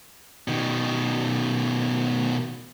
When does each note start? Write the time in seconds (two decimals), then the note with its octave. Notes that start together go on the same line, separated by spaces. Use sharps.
0.48 B2 D#3